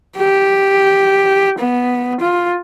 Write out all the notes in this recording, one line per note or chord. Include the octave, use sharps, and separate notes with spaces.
G4
B3
F4